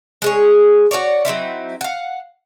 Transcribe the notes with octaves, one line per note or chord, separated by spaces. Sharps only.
G#3 G#4 C#5
F#4 A#4 C#5 D5
F#3 C4 D#4 E4
F5 F#5